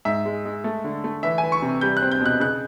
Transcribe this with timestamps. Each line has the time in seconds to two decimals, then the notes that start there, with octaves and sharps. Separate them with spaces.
0.05 G#2 E5
0.26 G#3
0.45 G#3
0.64 A3
0.84 D3
1.04 A3
1.23 E3 E5
1.38 G#5
1.43 E3
1.52 C#6
1.62 C3
1.81 G3 G6
1.97 F#6
2.02 C4
2.12 G6
2.21 B2 F#6
2.40 C#3 F#6